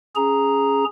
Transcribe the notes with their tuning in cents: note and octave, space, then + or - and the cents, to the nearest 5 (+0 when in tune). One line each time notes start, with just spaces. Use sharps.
C#4 +0 G#4 +0 A#5 +0